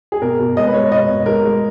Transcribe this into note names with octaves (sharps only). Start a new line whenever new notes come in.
G#4
B2 A#4
B2
G#3 D#5
B4
G#3 C#5
B2 D#5
B2
G#3 A#4
G#3